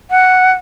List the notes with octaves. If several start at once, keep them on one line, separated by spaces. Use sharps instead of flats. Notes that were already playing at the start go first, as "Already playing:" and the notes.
F#5